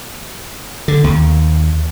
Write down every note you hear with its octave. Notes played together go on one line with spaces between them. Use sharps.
D3
D#2